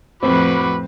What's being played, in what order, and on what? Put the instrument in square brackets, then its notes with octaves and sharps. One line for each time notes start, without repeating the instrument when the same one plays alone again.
[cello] F2 A2 [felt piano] C4 [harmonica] F#4 B5 D6 [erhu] B4